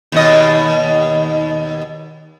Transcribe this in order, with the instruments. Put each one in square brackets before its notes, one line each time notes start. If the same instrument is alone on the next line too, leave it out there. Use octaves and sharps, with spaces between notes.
[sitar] D#2 B2 D#5